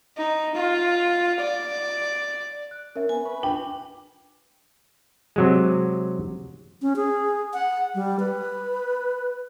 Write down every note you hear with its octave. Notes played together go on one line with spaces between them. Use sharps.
D#4
F4
D5
F#6
C#4 A#4 E5
B3 G#5
B4 C#6
D4 G5
C3 F#3 G#3
C#4
G#4
F#5
G3
B4